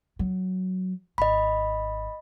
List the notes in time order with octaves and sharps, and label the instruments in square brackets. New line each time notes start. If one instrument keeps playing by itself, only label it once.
[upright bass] F#3
[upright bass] G#1 [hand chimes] D#5 B5